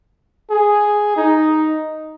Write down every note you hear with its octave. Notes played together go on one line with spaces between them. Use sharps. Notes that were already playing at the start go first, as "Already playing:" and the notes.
G#4
D#4